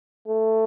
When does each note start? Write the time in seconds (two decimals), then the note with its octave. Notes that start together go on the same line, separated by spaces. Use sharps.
0.28 A3